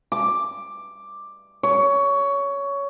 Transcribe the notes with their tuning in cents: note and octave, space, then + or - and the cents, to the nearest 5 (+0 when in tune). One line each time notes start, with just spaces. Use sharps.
D6 +5
C#5 +15